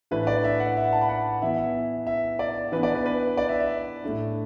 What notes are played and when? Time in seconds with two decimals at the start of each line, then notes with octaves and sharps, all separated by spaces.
0.11 A2 E3 D4 B4
0.27 D5
0.44 E5
0.60 F#5
0.77 E5
0.85 F#5
0.93 A5
1.01 B5
1.09 F#5
1.42 E3 B3 E4 E5
1.58 E5
2.07 E5
2.39 D5
2.72 E3 B3 D4 B4
2.83 D5
2.95 B4
3.06 B4
3.37 D5
3.49 E5
3.60 E5
4.04 A2 A3 D4